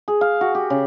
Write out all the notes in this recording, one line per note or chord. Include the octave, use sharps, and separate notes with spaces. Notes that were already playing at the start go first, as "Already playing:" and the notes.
G#4
F5
F#4
G4
C#3